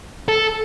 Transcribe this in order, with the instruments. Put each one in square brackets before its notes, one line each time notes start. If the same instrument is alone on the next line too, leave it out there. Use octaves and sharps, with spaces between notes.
[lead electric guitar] A4